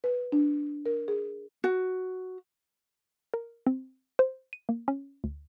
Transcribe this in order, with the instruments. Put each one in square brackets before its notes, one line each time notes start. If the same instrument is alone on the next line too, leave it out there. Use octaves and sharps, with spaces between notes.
[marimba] B4
D4
A#4
G#4
[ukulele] F#4
[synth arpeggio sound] A#4
C4
C5
D#7
A#3
C#4
D2